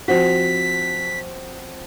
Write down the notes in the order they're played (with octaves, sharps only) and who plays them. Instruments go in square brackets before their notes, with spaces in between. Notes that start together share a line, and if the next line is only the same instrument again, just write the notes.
[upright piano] F3 C4 F#4 [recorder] B6